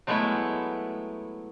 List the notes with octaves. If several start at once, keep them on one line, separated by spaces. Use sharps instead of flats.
F#3 G#3 A3 B3 E4